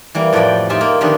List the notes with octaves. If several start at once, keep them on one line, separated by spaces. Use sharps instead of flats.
E3 G3 A#3
F2 A2 F3 F#4 D5 G5
D#4 F4 G4 D5 E5 G#5
A#3
D3 D#3 F3 A#3 B3 G4